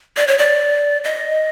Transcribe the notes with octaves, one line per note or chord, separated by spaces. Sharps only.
D5
C#5
D5
D#5